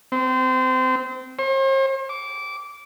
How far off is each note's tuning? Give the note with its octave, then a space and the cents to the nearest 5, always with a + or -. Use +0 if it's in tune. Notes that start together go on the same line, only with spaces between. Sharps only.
C4 -25
C5 +45
D6 -20